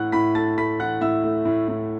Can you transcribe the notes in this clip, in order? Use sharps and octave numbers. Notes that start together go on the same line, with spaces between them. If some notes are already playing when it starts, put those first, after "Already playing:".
Already playing: A2 E3 F#5 F#6
A2 B5 B6
A3 A5 A6
A3 B5 B6
E3 F#5 F#6
A2 E5 E6
A3
A2
A2